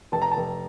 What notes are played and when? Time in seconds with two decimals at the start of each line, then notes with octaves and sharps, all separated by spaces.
0.12 F1 A5
0.22 A#5
0.31 A5
0.37 F1